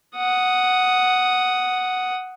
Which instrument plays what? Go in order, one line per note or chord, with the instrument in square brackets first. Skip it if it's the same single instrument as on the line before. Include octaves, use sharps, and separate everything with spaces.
[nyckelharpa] F#5 D#6